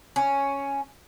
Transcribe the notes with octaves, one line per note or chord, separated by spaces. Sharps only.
C#4